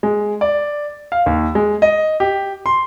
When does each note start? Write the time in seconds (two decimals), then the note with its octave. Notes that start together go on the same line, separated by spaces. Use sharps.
0.03 G#3
0.41 D5
1.12 F5
1.26 D#2
1.55 G#3
1.82 D#5
2.20 G4
2.66 C6